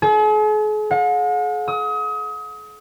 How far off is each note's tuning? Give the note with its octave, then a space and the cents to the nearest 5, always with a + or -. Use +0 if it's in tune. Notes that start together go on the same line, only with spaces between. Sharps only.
G#4 +45
F#5 -45
D#6 +35